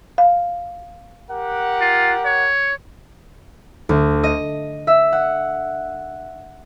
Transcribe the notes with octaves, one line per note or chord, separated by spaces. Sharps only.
F5
G4 A#4 F#5
F4
C#5
D2
D#5
E5
F#5